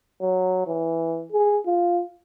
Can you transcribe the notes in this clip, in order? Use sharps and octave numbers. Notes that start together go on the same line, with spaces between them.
F#3
E3
G#4
F4